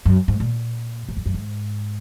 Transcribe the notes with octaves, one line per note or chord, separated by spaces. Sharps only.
F#2
G#2
A#2
G#2
F2
F#2
G#2